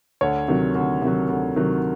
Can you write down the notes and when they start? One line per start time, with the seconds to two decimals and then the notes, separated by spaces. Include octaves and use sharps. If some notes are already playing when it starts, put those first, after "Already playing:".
0.21 D2 C#5
0.48 C3 D#3 F#3
0.75 D2
1.02 C3 D#3 F#3
1.29 D2
1.56 C3 D#3 F#3